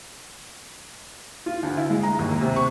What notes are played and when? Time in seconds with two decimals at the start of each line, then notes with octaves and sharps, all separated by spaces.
1.46 F4
1.63 D2
1.77 E4
1.90 G#3
2.03 A#5
2.19 D#2
2.41 C3
2.56 C#6